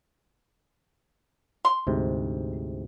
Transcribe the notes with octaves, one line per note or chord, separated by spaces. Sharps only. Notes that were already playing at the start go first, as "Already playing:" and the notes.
C6
D2 G#2 C3